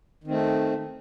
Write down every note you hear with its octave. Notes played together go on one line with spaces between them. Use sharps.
D#3 A3 C4